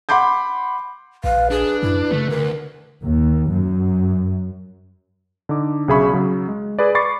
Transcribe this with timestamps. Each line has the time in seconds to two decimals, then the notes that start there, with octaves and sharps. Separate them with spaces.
0.09 F#5 B5 C6 D6 G6
1.24 A#1 B4 F5
1.50 D4 G#4
1.83 F#2 E4
2.11 C#3 A3
2.29 D2 A#4
3.04 D#2
3.50 F#2
5.49 D3 D#4 D6
5.88 B1 C#3 G#4 E5 B5 C#6
6.13 C#3 F#3
6.48 G#3
6.79 G#4 B4 D5
6.95 B5 C#6 D6 A6 C7